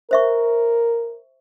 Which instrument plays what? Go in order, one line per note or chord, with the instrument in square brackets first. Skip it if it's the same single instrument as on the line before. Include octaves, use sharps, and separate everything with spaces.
[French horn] A#4 [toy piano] C5 E5 C#6